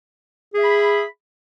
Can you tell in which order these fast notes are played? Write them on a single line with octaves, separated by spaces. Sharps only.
G#4 E5 B5